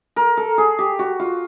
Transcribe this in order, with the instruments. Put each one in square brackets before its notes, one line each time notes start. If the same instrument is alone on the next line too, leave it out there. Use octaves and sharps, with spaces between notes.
[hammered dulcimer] A#4
A4
G#4
G4
F#4
F4